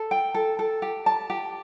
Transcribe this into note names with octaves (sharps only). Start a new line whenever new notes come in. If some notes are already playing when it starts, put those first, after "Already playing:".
Already playing: A4
G5
A4
A4
G4
A5
G4